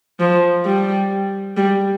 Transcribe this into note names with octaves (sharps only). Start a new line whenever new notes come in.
F3
G3
G3